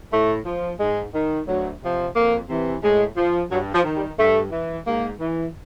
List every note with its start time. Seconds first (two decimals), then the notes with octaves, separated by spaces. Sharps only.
0.12 A2 A3
0.45 F3
0.79 G#2 G#3
1.13 D#3
1.47 D2 F#3
1.80 C3 F3
2.15 F2 A#3
2.48 C3 E3
2.82 A2 G#3
3.16 F3
3.50 G2 F#3
3.73 F3
3.84 D#3
3.96 G3
4.18 G2 A3
4.52 E3
4.86 G#2 A#3
5.19 E3